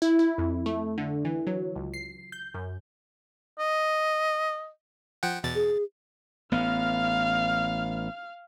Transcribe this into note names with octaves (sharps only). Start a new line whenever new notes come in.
E4
E4
F2
A3
D3
E3
F#3
C#2
C7
G6
F#2
D#5
F3 F#5 G5
E2 B2 A6
G#4
A1 B3 F5 F6